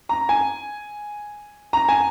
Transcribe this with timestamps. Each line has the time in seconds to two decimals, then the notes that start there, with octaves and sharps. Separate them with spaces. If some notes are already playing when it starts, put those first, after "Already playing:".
0.09 A#5
0.29 G#5
1.73 A#5
1.89 G#5